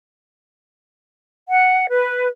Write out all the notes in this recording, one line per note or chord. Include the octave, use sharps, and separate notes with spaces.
F#5
B4